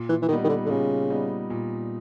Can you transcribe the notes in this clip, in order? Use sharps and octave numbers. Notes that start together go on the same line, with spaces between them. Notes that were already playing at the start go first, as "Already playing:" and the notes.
Already playing: A#2
E3
E3
D#3 G3 B3 D#4
D#3
D3
D3
A#2 C#3
G3 B3 D#4
A#2